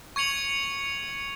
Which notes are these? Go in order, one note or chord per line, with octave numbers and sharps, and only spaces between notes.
C#6 G#6 C#7 F7 F#7